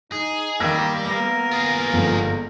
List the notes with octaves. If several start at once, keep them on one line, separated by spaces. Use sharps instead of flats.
D#4 G#4
D#3 G3 A#3 E6 G#6 A#6
A#3 B3 A#4
F4 G#4
G1 G#2 F3